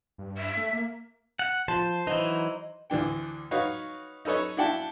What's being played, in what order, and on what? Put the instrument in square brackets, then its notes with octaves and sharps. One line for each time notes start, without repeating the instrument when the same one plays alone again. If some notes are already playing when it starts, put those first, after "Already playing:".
[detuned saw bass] G2
[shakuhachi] E5
[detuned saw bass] A3
A#3
[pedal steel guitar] F#5
[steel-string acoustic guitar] F3 A5 [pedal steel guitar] C5
[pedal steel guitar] E3 F#3 D#4 [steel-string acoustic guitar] C5 D#5
[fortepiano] D2 E3 D4 G5
D#4 F#4 B4 C#5 F5
D#4 A4 B4 C#5 D#5
D4 E4 F#4 F#5 G5 A5